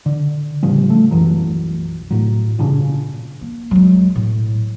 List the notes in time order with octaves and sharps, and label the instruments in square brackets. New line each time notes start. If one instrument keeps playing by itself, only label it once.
[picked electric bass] D3
A2 C#3 F3 G3
A3
B1 F#2 E3 F#3
A2 F#3
G1 A#2 C#3 D4
[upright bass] A#3
F#3 G#3
A2